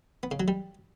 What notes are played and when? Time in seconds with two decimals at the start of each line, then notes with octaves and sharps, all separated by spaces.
0.23 B3
0.31 C#3
0.40 F#3
0.48 G3